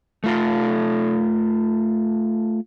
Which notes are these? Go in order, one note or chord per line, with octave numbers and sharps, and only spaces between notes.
A3 F4 A4